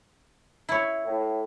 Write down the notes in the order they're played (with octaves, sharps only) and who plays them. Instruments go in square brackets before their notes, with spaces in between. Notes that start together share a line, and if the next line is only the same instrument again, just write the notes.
[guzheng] E4 C#5
[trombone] A2